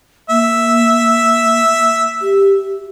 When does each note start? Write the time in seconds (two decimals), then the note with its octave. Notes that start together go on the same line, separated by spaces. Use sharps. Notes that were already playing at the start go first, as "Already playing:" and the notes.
0.30 A#3 E5
2.22 G4